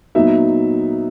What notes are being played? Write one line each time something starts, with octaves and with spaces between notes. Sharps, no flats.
A#2 F#3 B3 D#4 E5